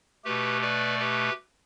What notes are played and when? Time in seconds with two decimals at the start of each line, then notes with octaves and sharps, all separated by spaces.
0.24 B2 A3 G4 B4
0.62 B4 D5
0.99 G4 B4